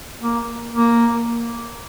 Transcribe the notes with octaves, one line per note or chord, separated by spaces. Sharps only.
A#3
A#3